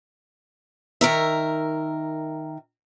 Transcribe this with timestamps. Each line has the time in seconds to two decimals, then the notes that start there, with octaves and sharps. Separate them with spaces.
1.01 D#3 A#4 E5